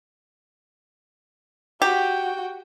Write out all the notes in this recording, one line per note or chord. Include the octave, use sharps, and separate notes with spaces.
F#4 G4 G5